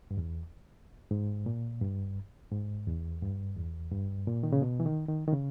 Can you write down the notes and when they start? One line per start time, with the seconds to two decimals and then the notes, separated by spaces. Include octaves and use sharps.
0.11 G2
0.18 E2
1.11 G#2
1.46 A#2
1.81 G2
2.51 G#2
2.87 E2
3.22 G2
3.56 E2
3.91 G2
4.27 A#2
4.43 D#3
4.52 C#3
4.62 B2
4.80 E3
4.86 D#3
5.08 D#3
5.28 D#3
5.32 C#3